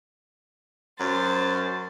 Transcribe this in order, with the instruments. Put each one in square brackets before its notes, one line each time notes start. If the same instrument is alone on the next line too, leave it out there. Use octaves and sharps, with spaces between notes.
[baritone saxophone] F#2 [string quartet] C5 A6